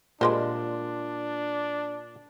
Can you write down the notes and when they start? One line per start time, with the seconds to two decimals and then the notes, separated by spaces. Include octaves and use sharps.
0.21 A#2 G3 G#3 D4 C5